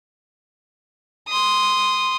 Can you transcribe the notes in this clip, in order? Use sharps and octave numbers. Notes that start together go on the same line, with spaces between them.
C6 D#6